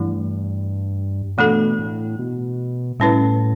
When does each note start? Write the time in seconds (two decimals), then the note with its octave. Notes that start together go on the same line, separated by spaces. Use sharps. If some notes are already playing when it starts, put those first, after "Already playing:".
Already playing: G2 E3 A3 E4
1.37 B2 E3 A3 D4 A4
1.79 A2
2.19 B2
3.00 A2 G3 C#4 E4 B4